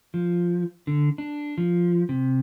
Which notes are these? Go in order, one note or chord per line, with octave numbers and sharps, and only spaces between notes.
F3
D3
D4
F3
C3